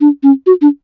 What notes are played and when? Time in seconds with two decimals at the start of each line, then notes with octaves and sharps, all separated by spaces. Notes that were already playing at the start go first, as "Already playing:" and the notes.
0.01 D4
0.23 C#4
0.47 F#4
0.62 D4